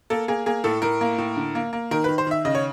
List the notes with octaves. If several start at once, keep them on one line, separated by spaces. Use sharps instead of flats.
A#3 A4
A#3 G#4
A#3 G#4
A2 A4
A2 A#4
A#3
A2
D3
A#3
A#3
D#3 A#4
B4
D#3
C5
D#3 E5
C#3 D#5
C#5